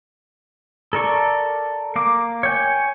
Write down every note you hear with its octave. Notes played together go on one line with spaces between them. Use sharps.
A4 A#4 D5 C#6
A#3 F5 D6
C#5 G5 G#5